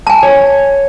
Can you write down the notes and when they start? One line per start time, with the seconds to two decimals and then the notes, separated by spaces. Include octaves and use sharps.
0.07 G#5 A5
0.22 C#5